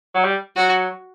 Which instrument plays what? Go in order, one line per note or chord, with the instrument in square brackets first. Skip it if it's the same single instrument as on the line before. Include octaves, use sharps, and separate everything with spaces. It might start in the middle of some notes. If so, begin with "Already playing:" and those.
[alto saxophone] F#3
G3
[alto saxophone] F#3 [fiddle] F#4